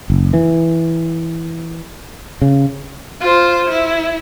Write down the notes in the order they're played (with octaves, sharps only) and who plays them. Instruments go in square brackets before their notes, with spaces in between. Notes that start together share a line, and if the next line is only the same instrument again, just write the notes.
[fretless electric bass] F#1
E3
C#3
[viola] F4 C5
E4